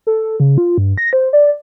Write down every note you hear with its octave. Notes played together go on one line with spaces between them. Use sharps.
A4
C#3
F4
G2
A#6
C5
D5